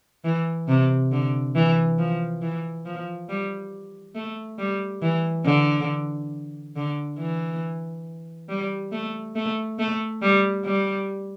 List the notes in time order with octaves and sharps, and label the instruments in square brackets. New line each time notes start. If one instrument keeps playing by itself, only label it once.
[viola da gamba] E3
C3
D3
E3
F3
E3
F3
G3
A3
G3
E3
D3
D3
E3
G3
A3
A3
A3
G3
G3